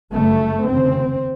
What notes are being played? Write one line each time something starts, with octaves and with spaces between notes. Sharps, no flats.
G1 F#2 C#3 A3
F1 D#2 C#3 C4